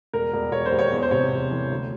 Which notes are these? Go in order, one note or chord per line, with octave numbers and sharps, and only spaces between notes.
E1 A#4
E1
E1 C#5
C5
D#2
C#5
E2
C5
C3 C#5
E2
E3
D2